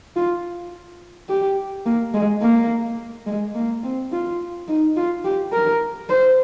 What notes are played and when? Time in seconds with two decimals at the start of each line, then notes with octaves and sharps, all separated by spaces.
0.16 F4
1.29 G4
1.86 A#3
2.14 G#3
2.42 A#3
3.26 G#3
3.55 A#3
3.83 C4
4.12 F4
4.68 D#4
4.96 F4
5.25 G4
5.53 A#4
6.09 C5